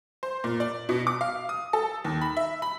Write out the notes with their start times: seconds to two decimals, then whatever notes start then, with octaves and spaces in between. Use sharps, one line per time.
0.23 C5
0.44 A#2
0.60 D5
0.89 B2
1.07 D6
1.21 F5
1.49 D#6
1.73 A4
2.04 D#2
2.22 B5
2.37 E5
2.62 B5